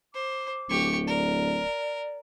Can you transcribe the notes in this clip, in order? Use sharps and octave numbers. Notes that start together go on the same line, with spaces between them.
C5 D6
D1 G4 C#6
A#4 D5